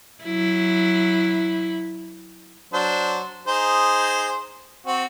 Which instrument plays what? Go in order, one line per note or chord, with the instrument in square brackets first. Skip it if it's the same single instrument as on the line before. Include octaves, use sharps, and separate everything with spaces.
[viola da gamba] F#3 E4
[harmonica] F#3 D4 C5
D#4 G#4 C5
C4 F#4